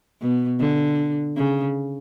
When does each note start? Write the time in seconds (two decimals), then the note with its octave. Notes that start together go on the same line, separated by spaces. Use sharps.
0.21 B2
0.60 D3
1.36 C#3